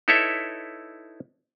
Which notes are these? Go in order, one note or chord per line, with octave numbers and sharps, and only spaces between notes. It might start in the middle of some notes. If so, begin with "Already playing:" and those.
D#4 E4 A4 B4 C#5 E5